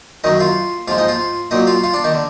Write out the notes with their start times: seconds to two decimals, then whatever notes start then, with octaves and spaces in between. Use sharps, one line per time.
0.24 F#2 D#3 F#3 D#4 D#5
0.40 F4 F5
0.88 G#2 F3 G#3 F4 F5
0.98 D#4 D#5
1.08 F4 F5
1.51 A#2 F#3 D#4 D#5
1.67 F4 F5
1.84 F4 F5
1.94 D4 D5
2.04 D#3 D#4
2.14 D3